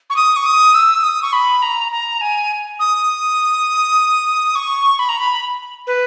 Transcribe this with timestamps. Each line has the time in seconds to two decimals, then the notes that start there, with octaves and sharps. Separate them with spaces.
0.10 C#6
0.16 D#6
0.36 C#6
0.46 D#6
0.75 E6
1.03 D#6
1.22 C#6
1.33 B5
1.62 A#5
1.92 A#5
2.21 G#5
2.80 D#6
4.55 C#6
4.99 B5
5.09 A#5
5.19 B5
5.87 B4